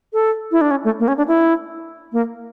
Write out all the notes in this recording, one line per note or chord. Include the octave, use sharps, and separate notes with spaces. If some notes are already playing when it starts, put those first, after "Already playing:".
A4
E4
D4
C#4
A3
A#3
C#4
D4
E4
A#3